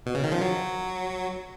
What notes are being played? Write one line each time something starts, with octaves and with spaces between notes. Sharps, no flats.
B2
C#3
D#3
F3
F#3